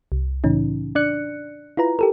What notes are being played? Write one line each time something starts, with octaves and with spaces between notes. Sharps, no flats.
C2
A2 C#3 E3 C#4 D#4
D4 D5 F#6 C#7
E4 F4 B4 A#5
G4 A4 A#4